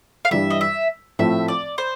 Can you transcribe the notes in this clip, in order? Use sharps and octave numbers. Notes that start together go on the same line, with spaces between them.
F5
G2 E3 G3 E5
D#5
E5
A2 F3 A3 C4 E5
D5
C5